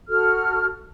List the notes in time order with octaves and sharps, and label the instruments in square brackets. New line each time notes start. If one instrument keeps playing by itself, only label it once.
[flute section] F#4 A4 F6